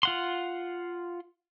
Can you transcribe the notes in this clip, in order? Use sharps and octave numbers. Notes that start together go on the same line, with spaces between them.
F4 F#5 C6